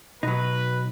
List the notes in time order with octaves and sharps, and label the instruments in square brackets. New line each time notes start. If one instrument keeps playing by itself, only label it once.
[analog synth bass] B2 [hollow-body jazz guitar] F#3 D#4 [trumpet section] B4